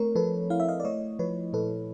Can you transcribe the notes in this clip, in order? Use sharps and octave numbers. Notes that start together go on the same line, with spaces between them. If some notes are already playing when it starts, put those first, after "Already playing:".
Already playing: A3 C4 A#4 C#5
F3 A4 B4
E4 F5
E5
D#5 F5
D5
A3 C#5 D#5
F3 B4 C#5
A#2 A4 B4